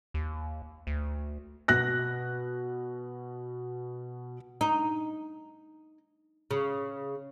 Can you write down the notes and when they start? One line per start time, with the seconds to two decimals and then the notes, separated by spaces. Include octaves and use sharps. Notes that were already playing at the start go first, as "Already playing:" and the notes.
0.14 D#2
0.87 D2
1.68 B2 F#6 A#6
4.61 D#4
6.51 C#3